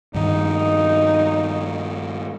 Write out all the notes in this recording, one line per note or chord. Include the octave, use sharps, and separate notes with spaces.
G2 D#3 D#4